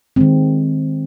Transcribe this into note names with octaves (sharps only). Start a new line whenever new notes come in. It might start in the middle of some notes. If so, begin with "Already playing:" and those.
D#3 G#3 C4